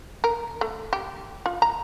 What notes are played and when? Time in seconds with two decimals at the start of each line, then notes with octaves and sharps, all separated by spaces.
0.24 A#4
0.61 A3
0.93 G4
1.46 F4
1.62 A#5